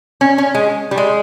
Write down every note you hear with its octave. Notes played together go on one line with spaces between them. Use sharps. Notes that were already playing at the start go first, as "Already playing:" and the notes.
C#4
C#4
G#3
G3
G#3